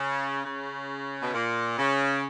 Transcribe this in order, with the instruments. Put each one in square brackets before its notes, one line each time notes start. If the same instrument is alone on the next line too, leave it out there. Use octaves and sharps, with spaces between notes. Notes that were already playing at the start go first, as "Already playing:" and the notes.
Already playing: [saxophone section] C#3
C#3
B2
A#2
C#3